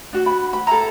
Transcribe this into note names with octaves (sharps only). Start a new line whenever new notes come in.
D4 F#4
B5
B5
E4 A4 A#5